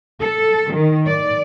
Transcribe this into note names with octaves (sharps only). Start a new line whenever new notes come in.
A4
D#3
D5